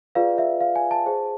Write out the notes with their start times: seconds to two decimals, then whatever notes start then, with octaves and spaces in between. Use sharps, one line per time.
0.15 F4 G#4 B4 D5 F5
0.38 E5
0.61 F5
0.76 G#5
0.91 A5
1.06 G#4 C5